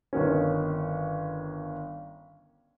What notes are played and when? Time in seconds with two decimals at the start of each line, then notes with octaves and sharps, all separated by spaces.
0.13 G1 D#3 C#4